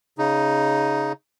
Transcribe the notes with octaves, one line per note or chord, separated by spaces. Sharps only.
C#3 D#4